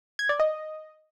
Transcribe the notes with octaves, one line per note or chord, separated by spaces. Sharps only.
G#6
D5
D#5